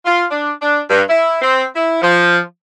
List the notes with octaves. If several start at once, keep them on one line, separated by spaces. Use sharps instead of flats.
F4
D4
D4
G2
E4
C4
E4
F3